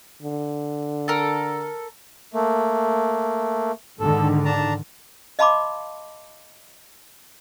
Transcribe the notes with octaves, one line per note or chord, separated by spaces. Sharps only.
D3
A4 A#4
A3 A#3
G#2 D3 D#3 A4
D4 A5 A#5
D#5 F5 A5 B5 C6 D6